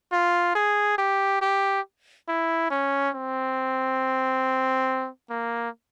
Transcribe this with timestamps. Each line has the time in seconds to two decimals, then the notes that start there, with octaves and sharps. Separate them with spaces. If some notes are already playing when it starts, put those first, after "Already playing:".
0.12 F4
0.55 G#4
0.98 G4
1.41 G4
2.28 E4
2.71 C#4
3.15 C4
5.30 A#3